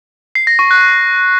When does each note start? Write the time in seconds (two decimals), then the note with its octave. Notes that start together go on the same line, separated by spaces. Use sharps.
0.35 C7
0.47 A#6
0.59 C#6
0.71 F#6